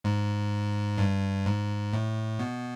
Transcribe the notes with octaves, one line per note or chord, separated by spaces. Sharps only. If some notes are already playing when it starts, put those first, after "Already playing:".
G#2
G2
G#2
A2
B2